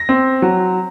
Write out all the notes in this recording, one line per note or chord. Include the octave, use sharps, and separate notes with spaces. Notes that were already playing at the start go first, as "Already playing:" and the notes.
Already playing: A#6
C4
F#3